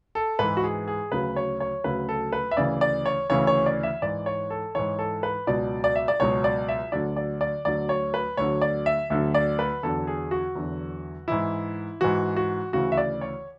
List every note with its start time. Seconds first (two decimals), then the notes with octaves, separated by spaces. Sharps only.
0.15 A4
0.39 G#2 E3 B4
0.57 F#4
0.63 G#4
0.88 G#4
1.12 D2 C#3 F#3 B4
1.36 C#5
1.60 C#5
1.84 D2 C#3 F#3 B4
2.09 A4
2.33 B4
2.51 E5
2.57 D2 C#3 E3 D5
2.81 D5
3.06 C#5
3.30 D2 C#3 E3 C#5
3.47 C#5
3.66 D5
3.83 E5
4.02 G#2 E3 D5
4.26 C#5
4.50 A4
4.75 G#2 E3 C#5
4.99 A4
5.23 B4
5.47 C#2 B2 F#3 D5
5.84 D5
5.96 E5
6.08 D5
6.20 C#2 B2 F#3 C#5
6.44 D5
6.69 E5
6.92 D2 D3 F#3 D5
7.16 D5
7.41 D5
7.65 D2 D3 F#3 D5
7.89 C#5
8.14 B4
8.37 D2 D3 F#3 C#5
8.61 D5
8.86 E5
9.10 D2 D3 F#3 E5
9.35 D5
9.59 B4
9.83 E2 D3 F#3 A4
10.07 G#4
10.31 F#4
10.55 E2 D3 F#3
11.28 G#2 E3 E4
12.01 G#2 E3 F#4
12.36 F#4
12.73 D2 C#3 E3 F#4
12.92 E5
12.97 D5
13.21 C#5